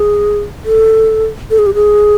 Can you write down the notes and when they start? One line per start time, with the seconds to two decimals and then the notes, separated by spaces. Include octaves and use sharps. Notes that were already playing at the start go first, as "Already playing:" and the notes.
Already playing: G#4
0.65 A4
1.51 A4
1.58 G#4
1.66 G4
1.74 G#4